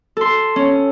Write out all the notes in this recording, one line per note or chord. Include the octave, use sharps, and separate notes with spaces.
A4 C6
C#4